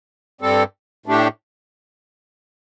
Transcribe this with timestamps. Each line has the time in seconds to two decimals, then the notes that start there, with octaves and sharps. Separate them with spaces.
0.41 G2 G3 C4 A4
1.06 A2 A3 D4 G4